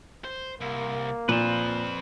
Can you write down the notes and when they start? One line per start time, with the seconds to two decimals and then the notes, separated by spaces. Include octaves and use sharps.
0.24 C5
0.61 C2 A#3
1.29 A#2 F3 C4 B4 C5